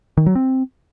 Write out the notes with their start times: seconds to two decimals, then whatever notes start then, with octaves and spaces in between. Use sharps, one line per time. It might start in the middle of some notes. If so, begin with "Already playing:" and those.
0.17 D#3
0.26 F#3
0.35 C4